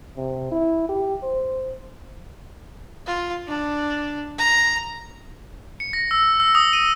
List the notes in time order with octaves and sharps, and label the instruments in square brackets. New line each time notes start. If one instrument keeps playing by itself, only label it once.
[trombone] C3
E4
G4
C5
[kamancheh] F4
D4
A#5
[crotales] C#7
A#6
E6
E6
D#6
D#7